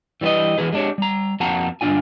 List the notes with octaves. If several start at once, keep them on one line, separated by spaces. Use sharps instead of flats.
E3 G3 E4 B4 D#5
E3 F#4 G#4 B4
G#3 A#3 D4 G4 C#5
G3 A#5
F2 A#3 F#4 F#5 A5 A#5
G2 D3 G#3 D4 F4 G#5